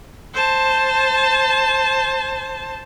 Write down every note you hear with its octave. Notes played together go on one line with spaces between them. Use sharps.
C5 A5